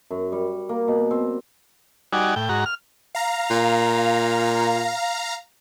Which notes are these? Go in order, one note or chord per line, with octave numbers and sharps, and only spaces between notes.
F#2
G3
A#3
B2
C4
G3 D#4 F#4 D5 G#5
A2 G5
G#2 F#4 A#5
F6
F5 A#5
A#2